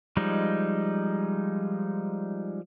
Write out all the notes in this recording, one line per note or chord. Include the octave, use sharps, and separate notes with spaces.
F3 G3 G#3 D#4